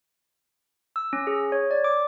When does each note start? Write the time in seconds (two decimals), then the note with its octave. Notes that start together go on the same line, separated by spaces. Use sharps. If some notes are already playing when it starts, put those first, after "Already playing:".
0.96 E6
1.13 C#4
1.27 G#4
1.52 C#5
1.71 D5
1.84 D6